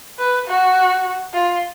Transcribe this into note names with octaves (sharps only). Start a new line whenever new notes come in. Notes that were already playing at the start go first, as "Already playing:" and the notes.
B4
F#4
F4